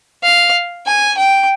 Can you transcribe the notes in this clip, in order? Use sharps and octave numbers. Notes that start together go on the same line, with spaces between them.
F5
G#5
G5